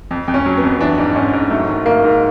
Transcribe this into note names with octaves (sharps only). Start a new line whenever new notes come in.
F2
F2
C#4
F#3
B3
F2
E3 D4
G#2
G#2 C#4
G#2
F#3 A3
D#3
G#2 A#3
G#2